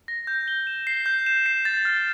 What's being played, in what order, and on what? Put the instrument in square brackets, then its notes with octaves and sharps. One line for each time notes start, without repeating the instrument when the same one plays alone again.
[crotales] A#6
G6
G7
E7
C7
G6
E7
C7
A6
F6